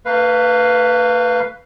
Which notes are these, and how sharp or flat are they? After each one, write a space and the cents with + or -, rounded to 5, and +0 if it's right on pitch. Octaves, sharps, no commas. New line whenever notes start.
A3 +45 B4 +0 F5 +0